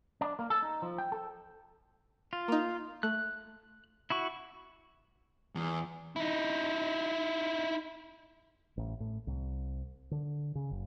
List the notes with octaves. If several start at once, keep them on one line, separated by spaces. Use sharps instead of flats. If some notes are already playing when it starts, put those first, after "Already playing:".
D4
A#3
A4
D#4
F3
G5
A4
F4
A#3 D#4
A3 F#6
E4 F#4 C#6
E2
D#4 E4
A1
A2
C2
D3
C#3
F#1